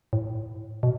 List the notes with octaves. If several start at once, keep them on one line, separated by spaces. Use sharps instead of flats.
A2
B2